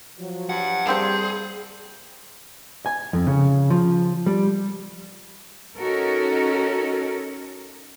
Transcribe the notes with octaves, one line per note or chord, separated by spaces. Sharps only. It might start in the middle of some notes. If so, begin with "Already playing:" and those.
F3 F#3
G2 F#5
G3 A#3 C4 G#4 C5
G#5
F2
C#3
F3
G3
C#4 D#4 F#4 A4 A#4